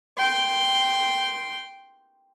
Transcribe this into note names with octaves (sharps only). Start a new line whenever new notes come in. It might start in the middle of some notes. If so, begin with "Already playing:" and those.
G5 C6